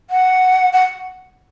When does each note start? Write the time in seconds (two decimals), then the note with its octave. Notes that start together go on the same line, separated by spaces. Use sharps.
0.10 F#5
0.73 F#5